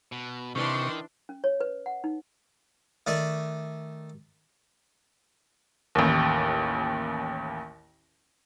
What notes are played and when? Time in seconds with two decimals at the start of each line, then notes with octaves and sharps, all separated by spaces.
0.12 B2
0.55 C3 D#3 E3 D4 C6 C#6
1.29 C#4
1.44 C#5
1.61 B4
1.86 F#5
2.04 D#4
3.07 D#3 A3 D5
5.95 A1 D#2